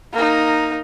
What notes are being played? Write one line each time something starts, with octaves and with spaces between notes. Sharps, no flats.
A#3 D#4